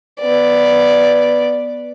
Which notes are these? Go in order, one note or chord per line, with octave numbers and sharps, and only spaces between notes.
B3 D5